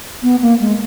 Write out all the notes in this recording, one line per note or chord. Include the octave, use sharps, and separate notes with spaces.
B3
A#3
G#3